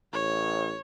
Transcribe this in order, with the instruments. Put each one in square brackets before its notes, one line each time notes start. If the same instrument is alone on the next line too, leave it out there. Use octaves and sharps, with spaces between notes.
[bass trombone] A1 [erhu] C#5